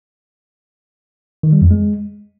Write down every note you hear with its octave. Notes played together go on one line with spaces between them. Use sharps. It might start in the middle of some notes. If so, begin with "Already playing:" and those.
D#3
G3
F2
G#3